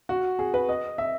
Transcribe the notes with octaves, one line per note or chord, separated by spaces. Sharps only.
F#4
G#4
B4
D#5
E5